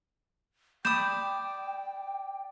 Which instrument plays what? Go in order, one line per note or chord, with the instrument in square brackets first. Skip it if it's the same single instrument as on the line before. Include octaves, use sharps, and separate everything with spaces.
[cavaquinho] D5 B5 D#6 [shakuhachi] G5 [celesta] G6 E7